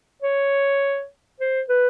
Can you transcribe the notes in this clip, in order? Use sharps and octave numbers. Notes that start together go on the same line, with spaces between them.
C#5
C5
B4